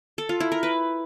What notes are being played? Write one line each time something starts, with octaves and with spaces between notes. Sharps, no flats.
A4
F4
E4
A#4
B4